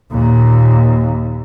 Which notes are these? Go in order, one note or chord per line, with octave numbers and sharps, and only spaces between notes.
D#2 A#2